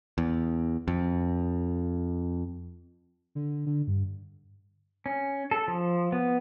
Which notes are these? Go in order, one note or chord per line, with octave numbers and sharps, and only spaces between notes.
E2
F2
D3
D3
G2
C#4
A4
F3
B3